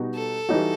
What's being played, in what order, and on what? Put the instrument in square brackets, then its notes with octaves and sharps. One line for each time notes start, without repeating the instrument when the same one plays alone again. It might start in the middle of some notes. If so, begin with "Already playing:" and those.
Already playing: [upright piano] B2 G3 B3 D#4 F#4
[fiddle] A4
[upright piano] E3 G3 D#4 F#4